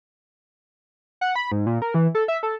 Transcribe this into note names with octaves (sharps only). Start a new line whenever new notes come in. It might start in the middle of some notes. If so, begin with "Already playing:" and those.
F#5
B5
G#2
A#2
A#4
E3
A4
E5
A4